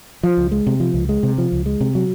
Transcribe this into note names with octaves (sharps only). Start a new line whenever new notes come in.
F3
C#2
G#3
C3
F3
C#2
G#3
C3
F3
C#2
G#3
C3
F#3